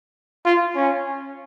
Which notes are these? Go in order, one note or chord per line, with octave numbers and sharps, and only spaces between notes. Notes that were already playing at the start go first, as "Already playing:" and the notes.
F4
C#4